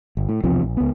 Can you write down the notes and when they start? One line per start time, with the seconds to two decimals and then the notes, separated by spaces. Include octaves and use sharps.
0.17 G1
0.29 A2
0.44 B1 E2 C3 F3
0.63 A#1
0.77 C#2 B3